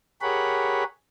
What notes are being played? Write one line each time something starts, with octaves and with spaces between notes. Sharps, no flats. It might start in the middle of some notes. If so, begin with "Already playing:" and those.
G4 G#4 A#4 C#5 F#5 B5